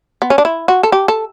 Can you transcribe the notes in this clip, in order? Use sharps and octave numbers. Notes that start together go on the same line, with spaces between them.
B3
C#4
D4
E4
F#4
A4
G4
A4